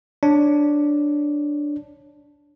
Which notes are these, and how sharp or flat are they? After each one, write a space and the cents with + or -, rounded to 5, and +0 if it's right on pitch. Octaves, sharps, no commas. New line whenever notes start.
D4 +0 C#5 +0